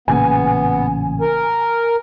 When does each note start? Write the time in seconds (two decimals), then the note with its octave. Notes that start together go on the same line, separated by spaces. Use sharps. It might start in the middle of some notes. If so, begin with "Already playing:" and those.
0.08 A1 A#2 C#3 B3 G#5
1.21 A#4